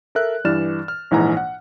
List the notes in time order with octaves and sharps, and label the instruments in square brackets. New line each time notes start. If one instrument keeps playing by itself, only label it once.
[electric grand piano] A4 A#4 E5 F#6
G2 E3 D5 F6 A6 E7
F6
A#1 G#2 E3 F#5 G#5 A#5
F#5